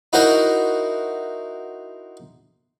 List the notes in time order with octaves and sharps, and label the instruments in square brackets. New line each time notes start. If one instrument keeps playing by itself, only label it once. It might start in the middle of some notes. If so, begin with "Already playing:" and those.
[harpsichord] D#4 E4 F#4 A#4 C5